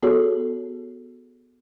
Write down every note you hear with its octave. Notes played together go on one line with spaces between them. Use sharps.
B3 F#4 G#4 A4 C#5